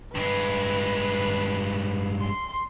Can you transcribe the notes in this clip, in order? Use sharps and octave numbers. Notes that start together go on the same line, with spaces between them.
G2 G#3 B4
C6